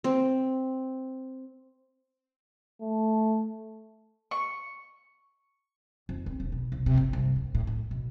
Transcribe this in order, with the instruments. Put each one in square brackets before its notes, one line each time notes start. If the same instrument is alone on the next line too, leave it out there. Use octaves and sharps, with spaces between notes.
[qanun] C4
[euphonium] A3
[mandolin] C#6
[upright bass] F2
C4
E1
B2
C2
C3
G1
C2
G2
A2
A2
B2